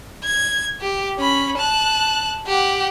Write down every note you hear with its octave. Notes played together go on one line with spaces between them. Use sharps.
G#6
G4
C#4 B5
A5 F#6
G4 F#5